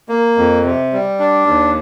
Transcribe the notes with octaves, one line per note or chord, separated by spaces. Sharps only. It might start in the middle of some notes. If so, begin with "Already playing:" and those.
A#3
F2
C3
G3
D4
D#2